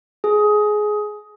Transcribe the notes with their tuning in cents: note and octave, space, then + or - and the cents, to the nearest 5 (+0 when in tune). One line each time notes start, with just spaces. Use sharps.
G#4 +15